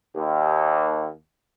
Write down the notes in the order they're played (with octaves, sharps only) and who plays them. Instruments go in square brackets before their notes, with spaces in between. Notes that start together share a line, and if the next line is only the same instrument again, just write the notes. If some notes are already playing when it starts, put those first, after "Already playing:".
[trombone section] D#2